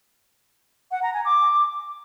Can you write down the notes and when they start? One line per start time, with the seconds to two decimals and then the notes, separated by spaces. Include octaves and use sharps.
0.91 F#5
1.03 A#5
1.14 G#5
1.25 D6